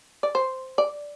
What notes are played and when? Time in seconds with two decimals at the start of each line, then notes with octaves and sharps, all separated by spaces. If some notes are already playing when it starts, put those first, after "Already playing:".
0.23 D5
0.35 C5
0.78 D5